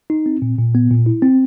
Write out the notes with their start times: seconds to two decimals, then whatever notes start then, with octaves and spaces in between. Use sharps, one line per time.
0.10 D#4
0.26 C4
0.42 A#2
0.58 A#2
0.75 B3
0.91 A#2
1.06 E4
1.22 C4